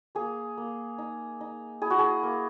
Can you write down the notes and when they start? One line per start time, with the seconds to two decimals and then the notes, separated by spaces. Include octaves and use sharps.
0.15 A#3 G#4
0.58 A#3
0.98 D#4
1.41 D#4
1.82 E4 G#4
1.90 F#4
1.99 G#4
2.23 A#3